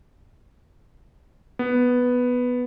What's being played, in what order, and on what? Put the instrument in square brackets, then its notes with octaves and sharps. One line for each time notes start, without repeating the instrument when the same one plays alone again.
[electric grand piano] B3